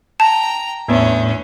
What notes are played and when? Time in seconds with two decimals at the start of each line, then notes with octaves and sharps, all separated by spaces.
0.20 G5 A5 A#5
0.88 E2 A2 C#4 D4 E5